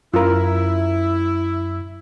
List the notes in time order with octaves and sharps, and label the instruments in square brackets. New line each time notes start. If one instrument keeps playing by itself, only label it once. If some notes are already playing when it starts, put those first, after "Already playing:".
[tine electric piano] F#2 [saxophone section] E4 [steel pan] F4 A#4